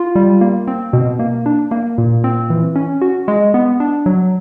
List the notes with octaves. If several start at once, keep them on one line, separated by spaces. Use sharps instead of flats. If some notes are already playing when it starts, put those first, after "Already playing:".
Already playing: F4
G3
A#3
C4
B2
A#3
D4
A#3
A#2
C4
E3
C#4
F#4
G#3
B3
D4
F#3